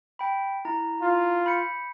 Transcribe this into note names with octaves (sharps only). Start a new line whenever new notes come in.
G5 B5
E4 A#5
F4
B5 G6 C#7